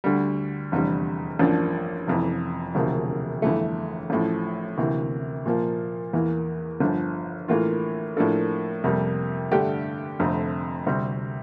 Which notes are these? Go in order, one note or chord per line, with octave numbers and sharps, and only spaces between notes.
D2 D3 G3
F1 E2 D3 G3
A1 G2 F3 A#3 D4
F1 F2 E3
E1 D2 C3 F3 A#3
G1 F2 E3 A3
A1 A2 F3
D2 C3 E3 A#3
A#2 F3 A#3
E2 E3 A#3
G1 G2 D3 F3
A2 E3 A#3 F4
A2 F3 A#3 D4 A4
F2 C3 G3 A#3
G2 D3 A3 D4 G4
F1 F2 D3 A3 C4
D2 C3 G3 C4